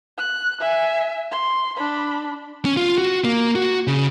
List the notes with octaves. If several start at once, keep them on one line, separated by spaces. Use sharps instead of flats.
F#6
E5 G#5
C6
D4 B5
C#4
F4
F#4
A#3
F#4
C#3